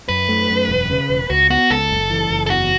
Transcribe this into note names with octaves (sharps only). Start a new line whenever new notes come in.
F#2 B4
A3
F#2
E1
C#3
E1
C#2 F#4
B3 F#4
C#2 A4
F#1
E3
F#1
A4
E2 F#4